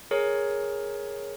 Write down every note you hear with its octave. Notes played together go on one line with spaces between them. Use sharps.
G#4 A#4 C#5